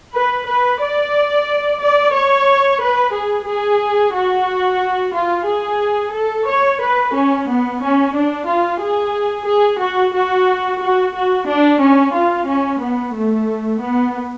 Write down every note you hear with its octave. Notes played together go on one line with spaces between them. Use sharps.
B4
B4
D5
D5
C#5
B4
G#4
G#4
F#4
F4
G#4
A4
C#5
B4
C#4
B3
C#4
D4
F4
G#4
G#4
F#4
F#4
F#4
F#4
D4
C#4
F4
C#4
B3
A3
B3